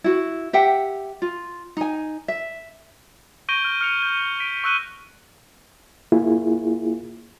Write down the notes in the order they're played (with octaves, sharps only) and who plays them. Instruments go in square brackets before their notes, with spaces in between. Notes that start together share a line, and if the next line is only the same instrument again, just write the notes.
[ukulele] E4 F#4
G4 E5 F#5 G5
F4
D#4 G#5
E5
[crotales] C#6 G6 A#6 D7 D#7 G7
F6
F6 C#7 F7
G6
B6 D7
C#6 E6 F#6 D#7 G7
[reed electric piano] A#3 E4 F4 G#4